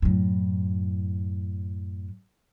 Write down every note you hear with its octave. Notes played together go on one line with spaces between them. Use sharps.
F#2 A2